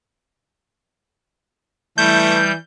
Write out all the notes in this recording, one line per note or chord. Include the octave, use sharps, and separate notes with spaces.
E3 G3 A3 G6